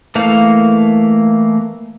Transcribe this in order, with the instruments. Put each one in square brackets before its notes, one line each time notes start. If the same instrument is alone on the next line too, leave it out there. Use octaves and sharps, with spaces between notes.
[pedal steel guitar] E3 A3 A#3 F5